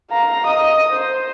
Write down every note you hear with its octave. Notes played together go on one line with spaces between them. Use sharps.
F5 A#5
D#5 D#6
C5